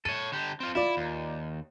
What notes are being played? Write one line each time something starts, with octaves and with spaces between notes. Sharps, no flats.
A4 C#5 D#7
D3 G4
C4 F4
E4 F4 D5
D#2